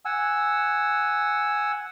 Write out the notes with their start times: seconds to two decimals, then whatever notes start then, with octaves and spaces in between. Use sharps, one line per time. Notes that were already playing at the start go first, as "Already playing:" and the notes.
0.05 F#5 G#5 E6